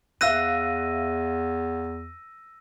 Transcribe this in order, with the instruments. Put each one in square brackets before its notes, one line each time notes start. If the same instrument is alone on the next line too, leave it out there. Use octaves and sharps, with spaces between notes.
[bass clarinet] E2 [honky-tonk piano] E5 F5 F#6 [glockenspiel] E6 A#6 D#7